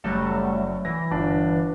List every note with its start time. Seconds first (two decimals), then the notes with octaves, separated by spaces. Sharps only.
0.04 F#1 F#3 G3 A3
0.85 E3 A#6
1.11 G1 D4